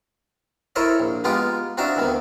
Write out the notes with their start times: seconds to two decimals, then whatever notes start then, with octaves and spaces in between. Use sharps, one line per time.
0.76 E4 A4 A#4 C5 C#5 D#5
0.99 A#1
1.24 G#3 B3 D#4 F4 G4
1.77 C4 D4 D#4 F#4 E5 F5
1.96 D2 D#3 B3